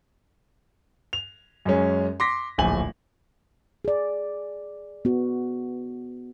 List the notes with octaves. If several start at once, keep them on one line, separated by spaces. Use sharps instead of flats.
F7
F#2 G#3 C#4
C6 D6 A#6 B6
D1 A#1 G#5 F#7
G#4 D5
B3 F#4